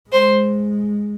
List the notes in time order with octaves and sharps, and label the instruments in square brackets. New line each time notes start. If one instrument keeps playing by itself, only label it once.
[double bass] G#3 [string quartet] C5